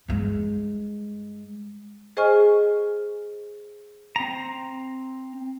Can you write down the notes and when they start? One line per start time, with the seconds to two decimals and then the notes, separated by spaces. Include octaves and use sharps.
0.08 G2 G#3
2.17 G#4 C5 D#5 G#5 C#6 F6
4.16 C4 A#5